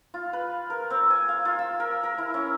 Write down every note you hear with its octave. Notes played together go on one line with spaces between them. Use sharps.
F4
B4
A#4
C4
G#5
F5
F4
E6
A#4
A#4
E4
C#4